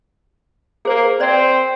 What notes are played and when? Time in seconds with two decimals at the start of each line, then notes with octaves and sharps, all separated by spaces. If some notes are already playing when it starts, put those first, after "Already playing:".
0.85 A#3 G#4 C5
1.20 C4 C5 D5